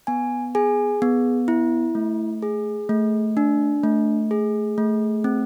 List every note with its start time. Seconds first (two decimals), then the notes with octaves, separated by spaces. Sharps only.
0.07 B3 G#5
0.55 G#4 G#5
1.02 B3
1.48 E4
1.95 A3
2.42 G#4
2.89 A3
3.37 D4
3.83 A3
4.31 G#4
4.78 A3
5.24 C4